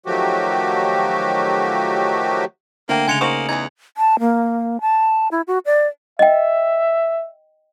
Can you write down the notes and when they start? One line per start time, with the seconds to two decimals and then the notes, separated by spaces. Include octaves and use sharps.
0.06 D#3 F3 F#3 A3 F#4 G4
2.89 D3 F3 A3 A#3 C4 G5
3.08 C#3 G#3 G#5 C#7 F7
3.21 A#3 D#4 F#4 C5 D#6 F#7
3.49 E2 D#4 G#4 G#6
3.97 A5
4.20 A#3
4.81 A5
5.31 E4
5.47 F#4
5.66 D5
6.19 D#5 E5 G5